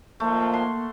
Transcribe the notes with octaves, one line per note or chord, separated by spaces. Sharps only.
A#2 D#3 F3 A3 A#3
F#5 C6